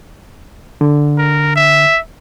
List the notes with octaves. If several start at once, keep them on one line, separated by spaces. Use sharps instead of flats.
D3
A#4
E5